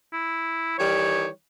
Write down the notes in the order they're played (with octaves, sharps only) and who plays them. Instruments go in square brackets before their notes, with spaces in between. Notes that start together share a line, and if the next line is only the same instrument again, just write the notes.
[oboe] E4
[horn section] D#3 E3 G3 [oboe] C#5